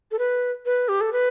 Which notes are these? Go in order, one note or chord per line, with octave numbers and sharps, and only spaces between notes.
A4
B4
B4
G4
A4
B4